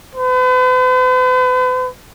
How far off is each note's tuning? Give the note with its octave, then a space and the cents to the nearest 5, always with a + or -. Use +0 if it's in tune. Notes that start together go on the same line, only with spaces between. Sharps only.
B4 +45